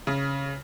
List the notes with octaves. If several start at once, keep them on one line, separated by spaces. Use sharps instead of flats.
C#3